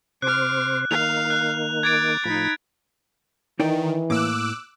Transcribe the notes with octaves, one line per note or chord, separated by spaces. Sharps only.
C3 C5 D6 F6 F#6
D#3 A#3 F5 F7
F#6
D6 G#6 A6 D7
A2 F3 D#4 B5
D#3 E3 D#4 D5 G5
A2 A#3 D6 E6 F#6